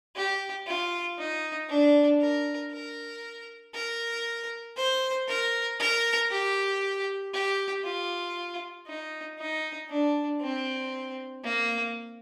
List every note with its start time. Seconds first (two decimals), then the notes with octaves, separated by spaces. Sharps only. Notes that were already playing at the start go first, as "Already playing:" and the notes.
0.16 G4
0.67 F4
1.18 D#4
1.69 D4
2.21 A#4
2.72 A#4
3.74 A#4
4.77 C5
5.28 A#4
5.79 A#4
6.31 G4
7.33 G4
7.84 F4
8.87 D#4
9.39 D#4
9.89 D4
10.41 C4
11.43 A#3